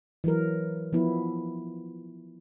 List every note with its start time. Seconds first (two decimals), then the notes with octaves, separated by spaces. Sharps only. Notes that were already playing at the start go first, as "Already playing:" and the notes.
0.24 E3 F#3 A#4
0.93 F3 B3 E4